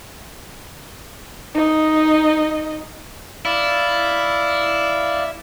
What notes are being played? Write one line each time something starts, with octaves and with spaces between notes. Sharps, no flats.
D#4 D#5
E4 D5 F5